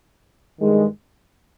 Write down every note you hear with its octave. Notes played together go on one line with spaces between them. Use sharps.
G2 D#3 G#3